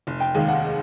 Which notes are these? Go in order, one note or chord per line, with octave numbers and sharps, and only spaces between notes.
F1
G5
D#2 D#3 G#3 F5
F#5